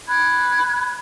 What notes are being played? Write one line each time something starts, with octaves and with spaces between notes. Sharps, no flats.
B5 F#6 G#6